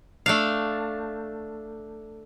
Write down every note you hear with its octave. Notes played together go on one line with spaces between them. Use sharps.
A3 D4 F5